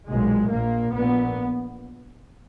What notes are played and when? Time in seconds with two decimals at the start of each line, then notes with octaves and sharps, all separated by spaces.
0.08 B1 A#2 G#3
0.50 A#1 A#2 A#3
0.93 A#1 A#2 B3